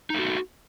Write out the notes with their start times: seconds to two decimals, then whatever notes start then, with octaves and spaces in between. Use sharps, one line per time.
0.10 D#4
0.14 A3
0.19 F#4